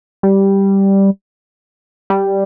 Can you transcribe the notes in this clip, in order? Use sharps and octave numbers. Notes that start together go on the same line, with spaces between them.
G3
G3